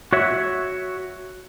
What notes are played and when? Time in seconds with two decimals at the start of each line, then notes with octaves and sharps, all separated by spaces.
0.13 F#4 C#5 E5